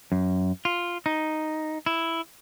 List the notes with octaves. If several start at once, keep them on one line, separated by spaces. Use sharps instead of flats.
F#2
F4
D#4
E4